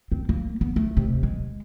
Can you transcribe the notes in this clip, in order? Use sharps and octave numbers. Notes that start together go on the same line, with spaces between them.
C4
A#3
B3
A3
D#2 C3
G#3